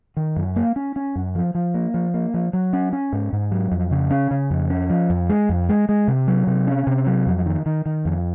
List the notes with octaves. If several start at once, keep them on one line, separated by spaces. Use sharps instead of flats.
D#3
F#2
A#3
C#4
C#4
F#2
F3
F3
A#3
F3
A#3
F3
F#3
C#4
C#4
G#2
G#2
F#3
F2
C#3
C#4
C#3
F2
C#4
F3
F2
G#3
F2
G#3
G#3
C3
F#3
C3
C#4
C3
F#3
F2
D#3
D#3
D#3
F2